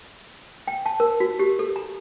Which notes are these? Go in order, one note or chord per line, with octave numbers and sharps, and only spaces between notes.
G5
A5
A#4
F#4
G4
A4
A#5